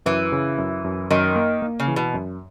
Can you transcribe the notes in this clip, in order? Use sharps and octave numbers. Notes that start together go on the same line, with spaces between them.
F#2 E3
C#3
F#2
F#2
F#2 D#3
A#3
A#3
C#3
E3
B2
F#2